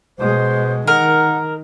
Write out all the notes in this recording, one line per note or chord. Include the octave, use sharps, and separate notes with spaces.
B2 G#3 C5
D#3 A#4 F#5